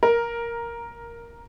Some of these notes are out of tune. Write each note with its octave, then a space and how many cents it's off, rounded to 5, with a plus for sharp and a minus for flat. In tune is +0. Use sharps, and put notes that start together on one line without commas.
A#4 +5